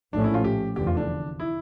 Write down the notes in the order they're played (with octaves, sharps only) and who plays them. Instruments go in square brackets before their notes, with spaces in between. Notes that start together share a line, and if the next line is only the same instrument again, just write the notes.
[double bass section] A#1 A2 F3 A3 C#4 [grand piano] D4
[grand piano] E4
F4
G4
[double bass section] F1 E2 D3 [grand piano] G4
[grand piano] F4
D4
E4